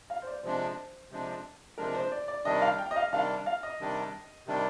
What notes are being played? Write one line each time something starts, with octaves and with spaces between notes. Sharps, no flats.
F5
C5
D5
C3 F3 G#3 D4 C5
C3 F3 G#3 D4
C3 F3 G#3 D4 A#4
C5
D5
D5
C3 D#3 G3 D4 D#5
F5
G5
D#5
F5
C3 D#3 G3 D4 F5
F5
D#5
C3 D#3 G3 D4
C3 D#3 G3 D4